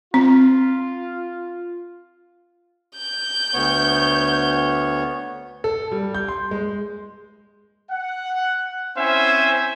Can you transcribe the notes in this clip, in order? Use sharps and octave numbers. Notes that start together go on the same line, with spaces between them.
C4 F4
G6
D2 B3 C#5
A4
G3
G6
C6
G#3
F#5
C4 C#4 E4 C5 E5 G#5